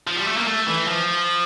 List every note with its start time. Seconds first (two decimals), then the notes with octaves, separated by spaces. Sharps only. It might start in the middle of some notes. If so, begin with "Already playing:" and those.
0.07 F3
0.17 G3
0.27 A3
0.37 A#3
0.47 A3
0.67 E3
0.88 F3